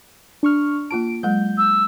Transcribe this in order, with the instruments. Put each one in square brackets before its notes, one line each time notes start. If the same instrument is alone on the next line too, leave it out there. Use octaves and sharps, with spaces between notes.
[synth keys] D4 C#6 F6
[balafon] A#3 F4 A5 [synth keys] D7
[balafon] F#3 G#3 [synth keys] G6
[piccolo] E6